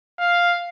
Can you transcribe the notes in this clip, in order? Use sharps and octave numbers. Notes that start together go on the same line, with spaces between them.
F5